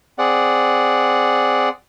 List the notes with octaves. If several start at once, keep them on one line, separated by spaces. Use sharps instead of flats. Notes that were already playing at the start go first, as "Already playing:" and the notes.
C4 G#4 D5 F#5